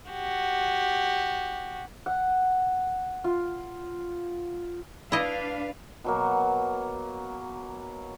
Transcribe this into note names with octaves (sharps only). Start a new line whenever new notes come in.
F#4 G4
F#5
F4
D4 E4 B4 D#5 F5
B2 F#3 A#3